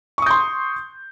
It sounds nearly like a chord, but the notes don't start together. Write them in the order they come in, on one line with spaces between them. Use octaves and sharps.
C#6 D#6 G6 C6